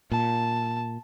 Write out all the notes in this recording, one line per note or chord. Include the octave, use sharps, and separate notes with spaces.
A#2 A5